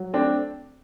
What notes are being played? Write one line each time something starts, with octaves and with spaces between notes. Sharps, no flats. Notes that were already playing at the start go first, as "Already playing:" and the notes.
Already playing: F#3
A3 C4 D4